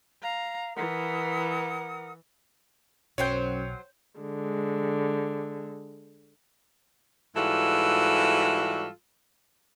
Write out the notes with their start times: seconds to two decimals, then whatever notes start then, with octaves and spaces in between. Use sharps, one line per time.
0.22 F5 A#5
0.76 E3 A#4 F#5 D#6
3.18 B1 F#2 F#3 C5 C#5 G5 G6
4.20 D3 G#3
7.36 G#2 E3 G3 F4 F#4 A4